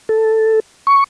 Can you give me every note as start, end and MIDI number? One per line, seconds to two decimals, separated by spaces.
0.09 0.60 69
0.87 1.04 85